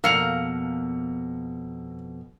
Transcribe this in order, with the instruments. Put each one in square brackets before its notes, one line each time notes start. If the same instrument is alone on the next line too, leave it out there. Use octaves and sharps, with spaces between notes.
[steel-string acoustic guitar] F2 B2 [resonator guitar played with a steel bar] A#3 A#4 F5 [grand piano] E6 C#7 F7